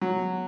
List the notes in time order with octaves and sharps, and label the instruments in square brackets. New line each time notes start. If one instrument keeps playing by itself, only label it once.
[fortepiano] F#3